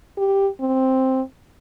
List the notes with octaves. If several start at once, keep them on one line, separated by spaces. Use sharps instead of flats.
G4
C4